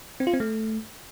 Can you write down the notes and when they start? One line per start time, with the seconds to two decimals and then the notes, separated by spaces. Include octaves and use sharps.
0.20 C4
0.27 F4
0.33 C4
0.40 A3